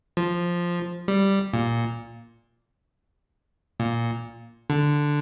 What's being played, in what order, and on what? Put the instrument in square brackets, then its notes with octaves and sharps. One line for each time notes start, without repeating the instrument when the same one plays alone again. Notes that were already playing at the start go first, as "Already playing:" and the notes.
[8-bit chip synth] F3
G3
A#2
A#2
D3